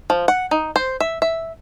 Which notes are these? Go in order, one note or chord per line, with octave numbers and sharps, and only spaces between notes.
F3
F#5
D#4
C5
E5
E5